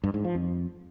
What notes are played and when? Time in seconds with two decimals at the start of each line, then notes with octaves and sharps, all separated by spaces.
0.04 G2
0.14 G#2
0.24 F3
0.35 F2